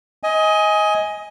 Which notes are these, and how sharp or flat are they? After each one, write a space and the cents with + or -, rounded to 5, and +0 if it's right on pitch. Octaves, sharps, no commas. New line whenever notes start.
D#5 +20 G#5 +0